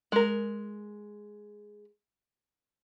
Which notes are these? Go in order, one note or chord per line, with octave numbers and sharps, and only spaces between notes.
G#3 A#4